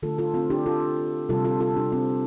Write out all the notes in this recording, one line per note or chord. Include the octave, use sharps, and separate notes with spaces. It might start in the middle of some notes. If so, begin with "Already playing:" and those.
D3 A3 F4 A4
F4 A4
C4 F4
D4 G4
F4 A4
C3 G3 F4 A4
F4 A4
F4 A4
D4 G4
C4 F4